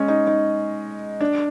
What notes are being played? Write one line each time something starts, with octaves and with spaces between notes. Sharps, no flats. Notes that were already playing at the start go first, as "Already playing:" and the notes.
Already playing: G#3 C#4
D#4
D#4
D4